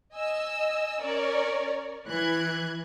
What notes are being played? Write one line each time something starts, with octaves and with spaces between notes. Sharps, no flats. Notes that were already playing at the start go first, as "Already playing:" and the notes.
D#5 G#5 E6
C#4 A#4 C#5 D5
E3 F#6 G#6